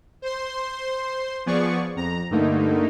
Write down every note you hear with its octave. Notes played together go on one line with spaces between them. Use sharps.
C5 C6
F3 B3 G#4 D5 C#6
F2 A#5
G2 D3 A3 A#3 D#4